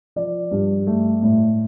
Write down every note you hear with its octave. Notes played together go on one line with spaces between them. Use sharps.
F3 D5
G2
A3
A2